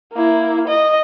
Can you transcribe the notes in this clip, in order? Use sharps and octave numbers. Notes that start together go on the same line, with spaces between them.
A#3 E4
D#5